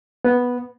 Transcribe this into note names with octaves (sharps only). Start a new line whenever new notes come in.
B3